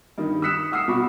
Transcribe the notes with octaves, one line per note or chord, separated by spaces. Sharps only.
G2 D#3
D#6 E6 F#6 B6 C#7 E7
F#5 D#6 E6 C7
C2 B2 F#4 B5 C#6 D6